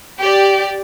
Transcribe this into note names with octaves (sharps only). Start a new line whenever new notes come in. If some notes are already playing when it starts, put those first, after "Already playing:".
G4 D5